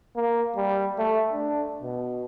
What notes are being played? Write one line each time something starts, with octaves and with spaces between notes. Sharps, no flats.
A#3
G3
A3
D4
B2